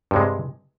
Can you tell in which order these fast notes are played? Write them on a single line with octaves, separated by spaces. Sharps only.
G2 C3 G#3